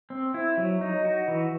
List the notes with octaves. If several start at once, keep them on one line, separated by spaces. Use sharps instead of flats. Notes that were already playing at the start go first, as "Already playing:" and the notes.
C4
E4
F#3
D#4
F#4
E3